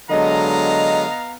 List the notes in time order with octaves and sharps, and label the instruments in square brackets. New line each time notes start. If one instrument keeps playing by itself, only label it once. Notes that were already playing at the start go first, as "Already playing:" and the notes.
[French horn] D3 [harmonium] F#3 G#3 [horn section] B3 F5 A#5 [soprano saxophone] D#5